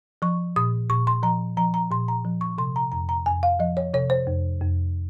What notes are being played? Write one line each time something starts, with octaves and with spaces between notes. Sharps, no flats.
F3 C#6
A#2 D#6
A#2 C#6
C6
F3 A#5
F3 A#5
A#5
A#2 C6
A#5
F3
C#6
C3 C6
A#5
F2 A#5
A#5
F2 G#5
F5
F3 D#5
C#5
C3 C#5
C5
F2
F2